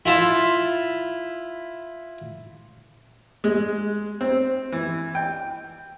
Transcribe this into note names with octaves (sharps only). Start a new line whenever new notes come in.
E4 F4 A5
G#3
C4
E3
G5